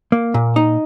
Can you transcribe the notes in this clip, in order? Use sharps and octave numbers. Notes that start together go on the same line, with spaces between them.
A#3
A#2
D#4